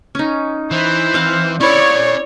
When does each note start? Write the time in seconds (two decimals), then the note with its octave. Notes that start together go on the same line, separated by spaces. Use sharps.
0.15 C#4 D#4
0.71 E3 C5
1.14 C4 F5 F#5
1.61 C#4 E4 C#5 D5 B5